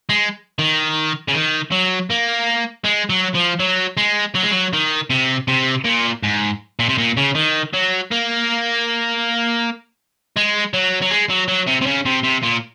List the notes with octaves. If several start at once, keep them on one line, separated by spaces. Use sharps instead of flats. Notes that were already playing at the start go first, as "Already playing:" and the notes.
G#3
D#3
C#3
D#3
F#3
A#3
G#3
F#3
F3
F#3
G#3
F#3
G#3
F#3
D#3
C3
C3
A#2
G#2
A#2
C3
A#2
C#3
D#3
F#3
A#3
G#3
F#3
F#3
G#3
F#3
F#3
C3
C3
C#3
C3
C3
A#2